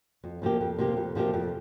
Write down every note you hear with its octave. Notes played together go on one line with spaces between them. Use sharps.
F2
C3 F3 A#3 G4
F2
C3 F3 A#3 G4
F2
C3 F3 A#3 G4
F2